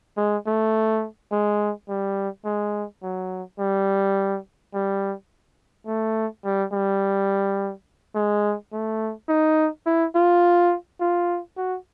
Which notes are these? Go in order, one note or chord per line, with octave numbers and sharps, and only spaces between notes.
G#3
A3
G#3
G3
G#3
F#3
G3
G3
A3
G3
G3
G#3
A3
D#4
E4
F4
F4
F#4